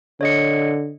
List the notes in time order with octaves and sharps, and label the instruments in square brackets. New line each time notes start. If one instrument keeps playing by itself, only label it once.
[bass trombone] D3 [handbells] C#5 D#5 C#7